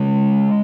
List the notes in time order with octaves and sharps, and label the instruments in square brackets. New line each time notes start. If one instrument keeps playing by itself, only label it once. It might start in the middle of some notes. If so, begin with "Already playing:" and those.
Already playing: [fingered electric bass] C#3 G#3